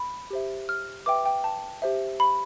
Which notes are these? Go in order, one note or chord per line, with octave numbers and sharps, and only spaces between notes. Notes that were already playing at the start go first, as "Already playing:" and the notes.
Already playing: B5
G4 C5 E5
F6
B4 E5 G5 D6
G5
A5
G4 C5 E5
B5